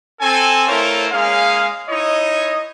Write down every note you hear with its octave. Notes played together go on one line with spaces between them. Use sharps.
C4 A4 G#5
A3 E4 F4 A#4 C5 C#5
G#3 A#3 C#4 G#4 F5
D#4 E4 C#5 D#5